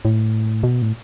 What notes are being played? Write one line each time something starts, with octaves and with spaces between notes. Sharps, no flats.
A2
B2
A2